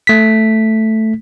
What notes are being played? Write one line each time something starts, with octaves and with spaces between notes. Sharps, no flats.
A3 B6